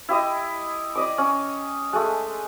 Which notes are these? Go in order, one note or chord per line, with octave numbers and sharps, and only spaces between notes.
E4 G4 D#5
D5 D#5 D6
C#4
G#3 A3